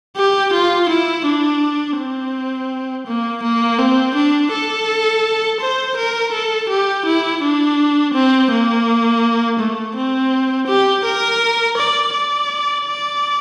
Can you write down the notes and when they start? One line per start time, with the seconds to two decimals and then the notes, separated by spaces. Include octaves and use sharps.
0.16 G4
0.53 F4
0.89 E4
1.25 D4
1.98 C4
3.07 A#3
3.43 A#3
3.79 C4
4.15 D4
4.52 A4
5.60 C5
5.97 A#4
6.33 A4
6.69 G4
7.06 E4
7.42 D4
8.14 C4
8.51 A#3
9.59 A3
9.96 C4
10.68 G4
11.04 A#4
11.77 D5
12.14 D5
12.86 D5